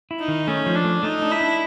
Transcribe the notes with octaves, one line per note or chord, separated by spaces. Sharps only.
E4
D#4
D#3
A3 C#4
F3
D4
A3
A3 D#4
D4
E4
D4